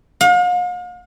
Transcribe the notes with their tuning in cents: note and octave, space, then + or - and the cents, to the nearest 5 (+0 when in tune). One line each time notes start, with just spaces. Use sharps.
F5 +45